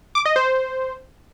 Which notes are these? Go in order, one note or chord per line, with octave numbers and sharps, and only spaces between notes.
D6
D#5
C5